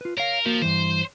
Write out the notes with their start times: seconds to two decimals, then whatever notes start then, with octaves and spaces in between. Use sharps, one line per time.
0.01 F4 B4
0.17 A#4 C#5 F5
0.46 F3 A#3 F#4 A#4
0.62 G2 E3 C5